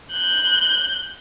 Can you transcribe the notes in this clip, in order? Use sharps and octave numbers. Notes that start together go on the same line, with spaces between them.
F#6 G6